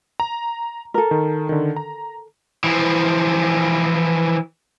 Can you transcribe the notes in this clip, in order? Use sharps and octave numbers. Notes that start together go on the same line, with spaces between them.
A#5
A4 A#4
D#3
D3 D#3
A#5
E3 F3